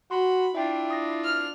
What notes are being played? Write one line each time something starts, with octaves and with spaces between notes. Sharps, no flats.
F#4 B5 C6
D4 E4 F4 E5 G5
D#6 A#6
F6